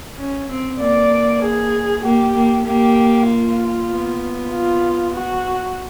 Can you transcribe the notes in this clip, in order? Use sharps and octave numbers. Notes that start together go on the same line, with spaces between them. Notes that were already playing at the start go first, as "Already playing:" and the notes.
C#4
C4
A#3 D5
G#4
A#3 G4
A#3
A#3 G4
F4
B3
F4
F#4